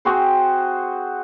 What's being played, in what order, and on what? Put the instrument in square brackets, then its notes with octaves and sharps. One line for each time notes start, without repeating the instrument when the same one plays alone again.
[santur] C4 F#4 G#4 C5